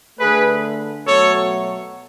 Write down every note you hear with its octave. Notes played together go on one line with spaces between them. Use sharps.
D3 A3 G#4 B4
B2 F#3 A3 A4 C#5